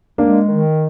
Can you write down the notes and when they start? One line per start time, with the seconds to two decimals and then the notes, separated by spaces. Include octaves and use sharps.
0.18 G#3 A#3 D4
0.49 D#3